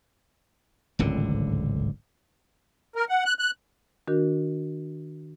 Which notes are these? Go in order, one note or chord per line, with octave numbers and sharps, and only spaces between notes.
D1 G#1 C#2 D3
A#4
F#5
F#6
F#6
D#3 D4 F#4 A#4